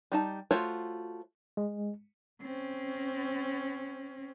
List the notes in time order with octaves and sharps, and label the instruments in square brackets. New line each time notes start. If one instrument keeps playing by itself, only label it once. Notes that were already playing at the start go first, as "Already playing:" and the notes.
[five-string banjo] G3 D#4 A5
A3 F4 F#4 C5 C#5
[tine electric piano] G#3
[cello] C4 C#4